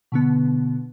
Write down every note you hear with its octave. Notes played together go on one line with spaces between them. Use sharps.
B2 D3 B3